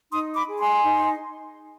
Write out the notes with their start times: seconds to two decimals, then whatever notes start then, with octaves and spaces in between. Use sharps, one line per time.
0.11 D#4 C6 D#6
0.34 B5 D6
0.47 G#4
0.59 G#5 C6
0.82 D#4